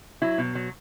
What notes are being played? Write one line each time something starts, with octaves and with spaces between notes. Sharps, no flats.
F#3 E4
B2
F#3